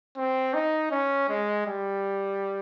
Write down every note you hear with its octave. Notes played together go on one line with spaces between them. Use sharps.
C4
D#4
C#4
G#3
G3